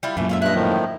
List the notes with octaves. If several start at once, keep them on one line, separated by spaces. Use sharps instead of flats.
G3 E4 F4
F#2 A#2 E3 A3
F4 A4 E5
G2 E4 D#5 F#6
A2 D#3 F3